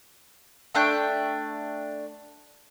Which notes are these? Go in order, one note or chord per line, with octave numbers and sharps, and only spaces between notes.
A3 D4 G5